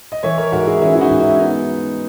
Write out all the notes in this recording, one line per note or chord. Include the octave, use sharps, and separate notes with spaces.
D#5
E3 C#5 E5
A#4 C#5
G#2 F#4 A#4
E4 G#4
E3 C#4 E4
E4
D#4 F#4
G#2
C#4 E4
B3 D#4